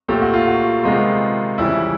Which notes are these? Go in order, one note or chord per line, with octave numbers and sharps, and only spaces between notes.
A#2 F#3 A3 G4
F#4
F4
F#4
C3 D#3 G#3 B3 F4
F2 C#3 E3 G3 E4